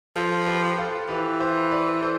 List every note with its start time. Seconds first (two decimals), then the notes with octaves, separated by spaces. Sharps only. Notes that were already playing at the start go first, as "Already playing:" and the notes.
0.16 F3 A4 C5
0.46 G4 B4
0.78 F4 A4
1.08 E3 G4 B4
1.40 C5 E5
1.71 B4 D5
2.02 A4 C5